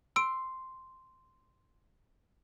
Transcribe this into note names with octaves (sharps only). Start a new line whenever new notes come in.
C6 E6 D7